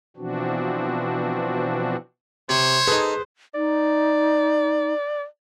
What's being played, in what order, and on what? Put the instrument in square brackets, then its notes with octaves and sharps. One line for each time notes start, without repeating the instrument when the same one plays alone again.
[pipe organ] B2 E3 F3 C4 D4 F#4
[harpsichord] C3 [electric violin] C5 [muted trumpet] C#5
[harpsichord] D#4 A4 [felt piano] G#4 B4
[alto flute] D#4 [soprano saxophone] D5